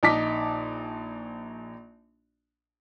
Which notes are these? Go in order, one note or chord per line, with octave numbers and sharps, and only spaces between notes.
A#1 D#4 A5 D6 B6